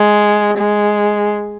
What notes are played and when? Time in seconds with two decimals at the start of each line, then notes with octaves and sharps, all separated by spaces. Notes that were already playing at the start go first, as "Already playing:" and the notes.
Already playing: G#3
0.58 G#3